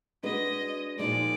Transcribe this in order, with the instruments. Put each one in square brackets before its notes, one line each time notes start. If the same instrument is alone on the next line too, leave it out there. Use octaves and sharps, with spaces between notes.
[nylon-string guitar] G#3 D4 F#4 B4 [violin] D#5
[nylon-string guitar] A#2 F3 G#3 D#4 [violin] D5